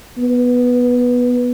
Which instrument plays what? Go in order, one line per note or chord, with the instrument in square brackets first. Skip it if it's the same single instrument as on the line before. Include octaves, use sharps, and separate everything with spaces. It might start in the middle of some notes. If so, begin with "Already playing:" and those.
[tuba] B3